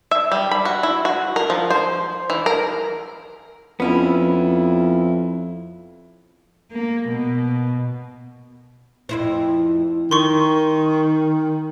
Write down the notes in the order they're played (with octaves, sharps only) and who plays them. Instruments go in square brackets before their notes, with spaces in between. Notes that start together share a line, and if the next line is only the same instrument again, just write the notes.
[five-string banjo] E5
G3
B5
F#4
E4
F#4
A#4
F3
C5
E3
A#4
[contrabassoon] F2 [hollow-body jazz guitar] B3 C#4 E4
[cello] A#3
B2
[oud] F2 E4 C5
[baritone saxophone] D#3 [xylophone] C6 C#6